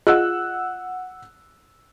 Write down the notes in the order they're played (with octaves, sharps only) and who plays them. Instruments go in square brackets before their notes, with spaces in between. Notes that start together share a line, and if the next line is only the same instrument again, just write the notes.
[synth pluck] F4 G#4 D#5 [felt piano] F#5 E6 F#6